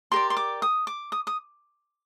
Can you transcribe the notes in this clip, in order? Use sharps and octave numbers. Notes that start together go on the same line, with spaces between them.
G4 A#4 D5 C6
C6
D6
D#6
D6
D#6
D#6